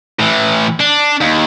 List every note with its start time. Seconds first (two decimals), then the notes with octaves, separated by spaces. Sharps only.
0.20 A2 E3
0.80 D4
1.21 D#2